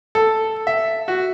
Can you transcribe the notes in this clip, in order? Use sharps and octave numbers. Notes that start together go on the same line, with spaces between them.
A4
E5
F#4